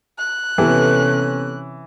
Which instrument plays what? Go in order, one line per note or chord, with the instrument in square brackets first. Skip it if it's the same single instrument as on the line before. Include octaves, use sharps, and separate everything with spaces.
[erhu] F#6
[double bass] C3 C#4 [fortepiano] E3 [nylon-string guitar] B3 G4 A4